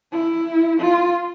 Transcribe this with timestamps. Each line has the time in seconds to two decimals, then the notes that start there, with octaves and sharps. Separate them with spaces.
0.12 E4
0.80 F4